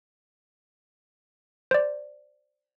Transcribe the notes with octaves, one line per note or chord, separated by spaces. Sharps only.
C5 D5